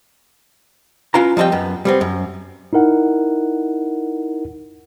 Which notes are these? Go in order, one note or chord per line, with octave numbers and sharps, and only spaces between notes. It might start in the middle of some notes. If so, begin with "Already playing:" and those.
C#4 E4 F4 B4 F5 A#5
F3 G3 C4 D#5 G5
F#2 B3
G3 B3 C4
F#2
D#4 E4 A#4 F#5